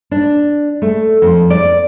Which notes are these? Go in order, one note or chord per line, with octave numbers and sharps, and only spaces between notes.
D4
A3
F2
D5